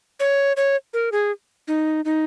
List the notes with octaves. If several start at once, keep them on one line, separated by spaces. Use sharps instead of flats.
C#5
C#5
A#4
G#4
D#4
D#4